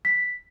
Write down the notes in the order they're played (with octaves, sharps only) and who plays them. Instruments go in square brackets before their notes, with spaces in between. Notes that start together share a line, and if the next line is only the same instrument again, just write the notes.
[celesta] B6